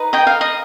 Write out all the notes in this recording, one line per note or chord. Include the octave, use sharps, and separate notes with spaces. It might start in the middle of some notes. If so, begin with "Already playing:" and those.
Already playing: D#4 B4
D#5 G5
F5
D#5